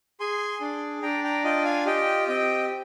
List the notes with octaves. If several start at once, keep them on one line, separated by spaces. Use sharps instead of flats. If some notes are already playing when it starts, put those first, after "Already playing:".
G#4 G#5 C6
D4
D4 G5 A#5
G5 A#5
F4 D#5 G5
F5 G#5
G4 D#5 G5
C4 D#5 G5